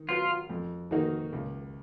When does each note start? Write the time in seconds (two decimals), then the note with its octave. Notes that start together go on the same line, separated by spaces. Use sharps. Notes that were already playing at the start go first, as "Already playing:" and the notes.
Already playing: D#3
0.09 F#3 B3 F4
0.50 F2
0.91 D#3 A#3 D#4 F#4
1.32 C#2